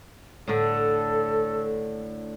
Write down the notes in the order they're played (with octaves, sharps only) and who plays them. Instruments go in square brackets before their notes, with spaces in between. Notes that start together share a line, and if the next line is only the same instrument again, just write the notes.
[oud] A2 D3 [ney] A4